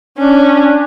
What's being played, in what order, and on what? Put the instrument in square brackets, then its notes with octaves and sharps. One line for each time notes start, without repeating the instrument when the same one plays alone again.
[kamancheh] C#4 [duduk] D4